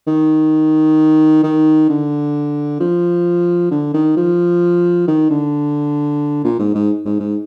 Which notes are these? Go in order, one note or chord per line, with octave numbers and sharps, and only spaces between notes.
D#3
D#3
D3
F3
D3
D#3
F3
D#3
D3
A#2
G#2
G#2
G#2
G#2